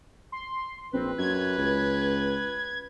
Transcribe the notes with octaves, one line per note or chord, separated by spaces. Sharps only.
C6
A#1 C4 B4
F#2 G#6
C#2